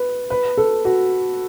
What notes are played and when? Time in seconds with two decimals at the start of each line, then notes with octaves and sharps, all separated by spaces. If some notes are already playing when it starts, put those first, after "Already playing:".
Already playing: B4
0.30 B4
0.57 A4
0.85 F#4